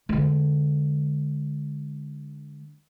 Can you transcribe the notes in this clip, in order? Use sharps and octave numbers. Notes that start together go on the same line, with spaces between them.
D3 G#3